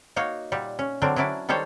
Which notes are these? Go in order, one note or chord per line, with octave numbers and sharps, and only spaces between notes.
A#3 D#4 F#4 C#5 F5
A#2 G3 F#5
C#4
D3 F#3 C4 D4 A#4
F#3 C#4 D4 E4 D5
D#3 G3 A4 C5 C#5